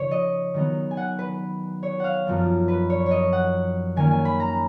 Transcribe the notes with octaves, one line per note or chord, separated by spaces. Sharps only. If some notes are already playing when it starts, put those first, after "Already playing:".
Already playing: C#3 F3 D#4 C#5
D#5
D#3 F#3 B3 D#4
G#5
F#5
B4
C#5
F5 F#5
F#2 F3 B3 D#4
B4
C#5
C#5 D#5
F#5
D#3 A#3 C#4 G#5
G#5
B5
A#5